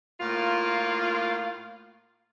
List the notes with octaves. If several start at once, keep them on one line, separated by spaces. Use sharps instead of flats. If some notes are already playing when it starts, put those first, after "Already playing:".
A2 A#3 F4